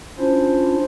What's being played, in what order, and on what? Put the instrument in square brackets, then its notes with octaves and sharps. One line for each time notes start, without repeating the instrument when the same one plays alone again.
[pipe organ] C#4 D4 E4 F4 C5